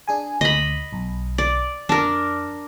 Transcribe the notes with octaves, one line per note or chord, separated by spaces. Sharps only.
D4 G#4 G#5
D2 D#5 B5
B1
D5
F2 D4 A#4